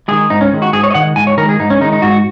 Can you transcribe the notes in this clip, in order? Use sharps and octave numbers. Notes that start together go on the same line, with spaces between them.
D#3 G#3 G#4
G#2 D#4
C#4
D#3 G#3
F#4
G#2 G#4
C#5
D#5
D#3 G#3 F#5
G#2 G#5
C#5
D#3 G#3 A#4
G#4
G#2 D#4
C#4
D#3 G#3 D#4
D#4
G#2 F#4